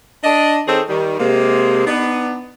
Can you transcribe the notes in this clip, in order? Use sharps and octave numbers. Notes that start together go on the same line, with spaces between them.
D4 D#5
D#3 C4 D#4 G#4 A4 C#5
D#3 G3
C3 G#3 A#3
B3 D4 D#4